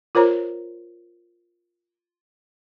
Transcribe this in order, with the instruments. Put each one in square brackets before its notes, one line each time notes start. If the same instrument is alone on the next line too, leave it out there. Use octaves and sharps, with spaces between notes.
[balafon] F4 A#4 C5 C#5 A#5